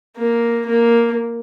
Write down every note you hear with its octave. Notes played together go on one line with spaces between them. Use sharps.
A#3
A#3